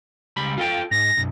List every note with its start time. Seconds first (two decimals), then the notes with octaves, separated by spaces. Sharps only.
0.37 C#2 G3 B5
0.58 F4 A4 G5
0.91 G#2 A#6
1.17 B1 F#2